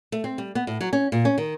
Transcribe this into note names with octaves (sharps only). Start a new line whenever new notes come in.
A3
C4
G3
B3
A2
F#3
C#4
A#2
C#4
D#3